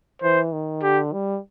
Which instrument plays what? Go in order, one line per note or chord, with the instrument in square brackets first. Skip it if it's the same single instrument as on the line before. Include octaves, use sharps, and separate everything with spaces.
[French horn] E3 [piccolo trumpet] C5
[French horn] D#3
[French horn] D3 [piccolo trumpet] G4
[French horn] G3